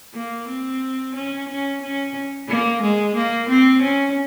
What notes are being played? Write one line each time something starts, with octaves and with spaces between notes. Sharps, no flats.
A#3
C4
C#4
C#4
C#4
A#3
G#3
A#3
C4
C#4